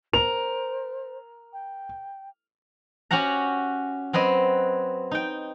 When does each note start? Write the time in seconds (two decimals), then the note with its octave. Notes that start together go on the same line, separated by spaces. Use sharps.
0.13 A#4 C5 F7
1.53 G5
3.11 C#4 F#4 G4 F#5 A#5
4.13 F#3 C4 B4 D#5
5.11 D#4 G5